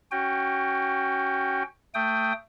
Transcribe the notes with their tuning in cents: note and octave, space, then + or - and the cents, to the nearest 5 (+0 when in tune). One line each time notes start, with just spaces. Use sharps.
C#4 +0 F#4 +20 G5 +15
A3 +20 G5 +0 D#6 +15